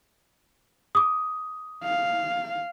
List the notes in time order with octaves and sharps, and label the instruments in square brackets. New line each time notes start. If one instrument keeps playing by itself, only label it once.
[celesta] D6 D#6
[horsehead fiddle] F5